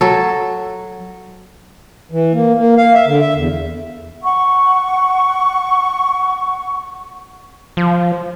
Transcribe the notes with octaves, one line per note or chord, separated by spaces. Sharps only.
F#3 A4
E3
A#3
A#3
F5
E5
D3
E5
E2
F#5 C#6
F3